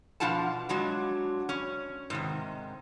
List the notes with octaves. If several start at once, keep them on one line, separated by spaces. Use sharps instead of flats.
B2 F3 D4 F4 F#5 A5
F#3 G#3 D4 F#4
C#4
G#2 C3 D#3